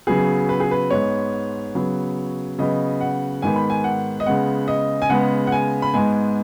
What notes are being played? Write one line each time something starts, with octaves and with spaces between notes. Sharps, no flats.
C#3 F#3 B3 G#4
B4
G#4
B4
G#2 G#3 B3 C#5
C#3 F#3 B3
C#3 F#3 B3 D#5
F#5
G#2 D#3 B3 G#5
B5
G#5
F#5
D#5
C#3 G#3 B3 F#5
D#5
G#5
C#3 G#3 B3 F#5
F#5
G#5
B5
G#2 G#3 B3 G#5